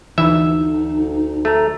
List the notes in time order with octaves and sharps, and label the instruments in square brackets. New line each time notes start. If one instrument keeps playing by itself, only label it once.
[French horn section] D2 [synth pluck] E3 [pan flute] D#4 [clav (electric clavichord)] E5
[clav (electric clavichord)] A3 [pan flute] A#5